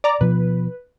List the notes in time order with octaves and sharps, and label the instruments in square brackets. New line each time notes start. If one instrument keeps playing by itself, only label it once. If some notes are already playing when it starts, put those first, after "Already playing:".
[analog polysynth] D5 A#5 D6
[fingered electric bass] B2 F3 [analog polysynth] B4